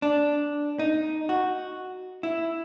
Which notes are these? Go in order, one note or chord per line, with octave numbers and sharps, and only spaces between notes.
D4
D#4
F#4
E4